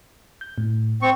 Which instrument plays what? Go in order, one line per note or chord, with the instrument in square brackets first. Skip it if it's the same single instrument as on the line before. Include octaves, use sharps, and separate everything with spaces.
[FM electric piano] G6
A2
[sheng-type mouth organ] C4 C#6